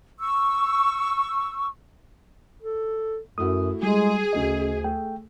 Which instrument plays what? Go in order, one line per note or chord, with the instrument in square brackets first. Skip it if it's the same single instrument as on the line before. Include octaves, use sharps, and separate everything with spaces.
[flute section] C#6 E6
[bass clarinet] A4
[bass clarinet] F#2 [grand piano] A3 E4 F#4 [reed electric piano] D#6
[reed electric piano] G3 [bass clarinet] G#3 [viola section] G#4
[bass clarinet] D2 [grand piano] C#3 A3 F#4 [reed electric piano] D#5
[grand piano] A3 [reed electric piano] G5